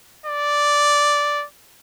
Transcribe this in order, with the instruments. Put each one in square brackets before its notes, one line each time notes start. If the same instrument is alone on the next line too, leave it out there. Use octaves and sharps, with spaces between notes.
[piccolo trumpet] D5